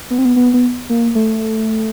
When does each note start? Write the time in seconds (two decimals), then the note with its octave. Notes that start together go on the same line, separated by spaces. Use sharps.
0.10 B3
0.18 C4
0.25 B3
0.36 B3
0.54 B3
0.89 A#3
1.15 A3